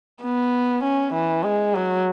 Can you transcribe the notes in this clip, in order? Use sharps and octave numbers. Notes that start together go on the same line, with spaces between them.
B3
C#4
E3
G#3
F#3